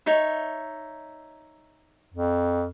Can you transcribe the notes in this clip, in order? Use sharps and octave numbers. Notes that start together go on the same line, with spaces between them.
D#4 C#5 E5
F2